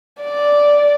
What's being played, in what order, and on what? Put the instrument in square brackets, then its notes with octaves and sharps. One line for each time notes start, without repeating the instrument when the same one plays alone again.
[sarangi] D5